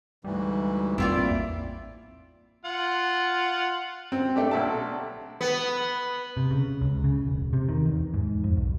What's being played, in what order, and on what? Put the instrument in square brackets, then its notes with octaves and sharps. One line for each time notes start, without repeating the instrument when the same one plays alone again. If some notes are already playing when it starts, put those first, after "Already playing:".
[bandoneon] D2 G#2 E3 [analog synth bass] G3
[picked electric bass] A1 E2 A#3 [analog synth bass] C4 [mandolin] E4 F4 D5
[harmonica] F4 F#5
[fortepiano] C4
A3 D4 G4
B1 E5 A5
[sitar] B3
[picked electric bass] C3
C#3
C#2
C#3
E1
C3
D#3
E2
G#2
F2
B1